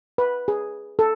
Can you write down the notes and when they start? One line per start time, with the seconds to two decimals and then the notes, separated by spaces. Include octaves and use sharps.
0.18 B4
0.48 G#4
0.99 A4